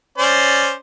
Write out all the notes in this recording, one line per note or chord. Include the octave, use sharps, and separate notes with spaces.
C#4 C5 D5